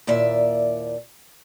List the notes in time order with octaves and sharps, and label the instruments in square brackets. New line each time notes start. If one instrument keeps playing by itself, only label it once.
[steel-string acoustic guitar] D#2 A#2 E4 D5 E5